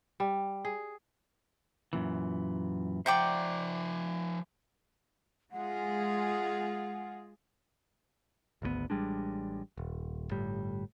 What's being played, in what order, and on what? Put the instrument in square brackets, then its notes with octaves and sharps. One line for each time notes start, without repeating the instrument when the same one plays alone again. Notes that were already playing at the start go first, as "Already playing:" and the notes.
[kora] G3
G#4
[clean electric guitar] F#2 A#2 E3
[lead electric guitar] F3 E5 [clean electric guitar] C5 F#5 [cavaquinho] D5 G5 A#5
[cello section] G#3 F4 G#4 [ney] F#5
[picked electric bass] G#1 D2 E3 B3
A1 G3 G#3 D4
D#1
G1 A2 G3